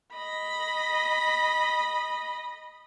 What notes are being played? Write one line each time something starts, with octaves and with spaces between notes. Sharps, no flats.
D#5 B5